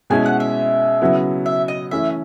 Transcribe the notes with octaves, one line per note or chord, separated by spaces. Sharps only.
B2 G#3 C#4 E4 G#5
F#5
E5
C#3 F#3 B3 E4
E5
D#5
E3 A3 C#4 E4 E5